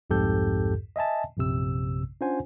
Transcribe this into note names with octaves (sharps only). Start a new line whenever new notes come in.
C2 F2 G#2 G4 A4 G6
D#5 E5 G#5 A5
A#1 F#2 C3 E6
C#4 D4 F4 C5 F#5 G#5